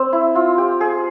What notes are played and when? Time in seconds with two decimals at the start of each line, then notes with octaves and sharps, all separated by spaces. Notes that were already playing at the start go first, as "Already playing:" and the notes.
Already playing: C4
0.13 E4
0.35 F4
0.58 G4
0.81 G#4